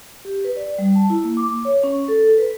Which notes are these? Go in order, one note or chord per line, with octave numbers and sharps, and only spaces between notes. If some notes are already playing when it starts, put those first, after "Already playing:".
G4
B4
D5
G3
A5
E4
A#3
D6
C#5
C#4
A4
B4